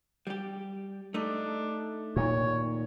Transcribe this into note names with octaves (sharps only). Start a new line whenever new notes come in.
G3 G4
A3 D4 D#4
A#2 D#3 C#5